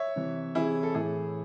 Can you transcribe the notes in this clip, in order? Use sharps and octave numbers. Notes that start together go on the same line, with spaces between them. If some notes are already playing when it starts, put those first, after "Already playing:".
Already playing: C#5 E5
C3 E3
C3 E3 E4 G#4
A4
A2 E3 E4 G#4